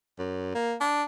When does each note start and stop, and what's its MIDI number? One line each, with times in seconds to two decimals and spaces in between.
0.19 0.53 42
0.55 0.76 58
0.80 1.04 62